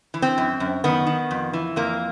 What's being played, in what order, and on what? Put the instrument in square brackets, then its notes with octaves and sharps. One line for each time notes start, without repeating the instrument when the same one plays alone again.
[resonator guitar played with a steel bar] E3
C4
F#2
F#2
D#3 B3
D#3
F2
E3
F2 A#3